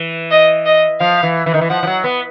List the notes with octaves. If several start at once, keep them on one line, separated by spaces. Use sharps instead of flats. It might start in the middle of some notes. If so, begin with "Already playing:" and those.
Already playing: E3
D#5
D#5
F3 F5
E3
E3
D#3
E3
F3 F#5
F3
F#3
B3